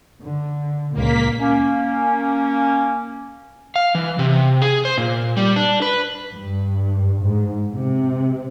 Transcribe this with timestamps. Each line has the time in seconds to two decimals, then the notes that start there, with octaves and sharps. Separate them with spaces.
0.21 D3
0.94 C#2 A#2 A#3 B6
1.39 A#3 C#4
3.76 F5
3.95 E3
4.19 C3
4.62 G#4
4.85 C5
4.98 A#2
5.37 G3
5.56 D4
5.82 B4
6.32 G2
7.21 G#2
7.71 C3